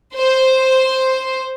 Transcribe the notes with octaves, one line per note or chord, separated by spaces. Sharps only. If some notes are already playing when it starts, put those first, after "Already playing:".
C5